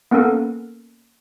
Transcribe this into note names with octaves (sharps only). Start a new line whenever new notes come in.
A#3 B3 C#4 A4 A#4